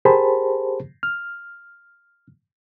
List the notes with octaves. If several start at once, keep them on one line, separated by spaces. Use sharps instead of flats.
G4 G#4 A#4 C5 A5 B5
F6